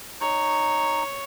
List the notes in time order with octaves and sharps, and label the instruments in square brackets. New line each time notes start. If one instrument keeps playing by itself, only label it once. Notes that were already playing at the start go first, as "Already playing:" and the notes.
[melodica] D#4 [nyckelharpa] C#5